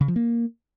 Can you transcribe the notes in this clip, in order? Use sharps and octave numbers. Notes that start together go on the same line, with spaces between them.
C#3
F3
A#3